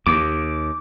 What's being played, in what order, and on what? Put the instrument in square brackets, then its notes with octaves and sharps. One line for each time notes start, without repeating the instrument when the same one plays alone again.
[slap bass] D#2 [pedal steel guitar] D6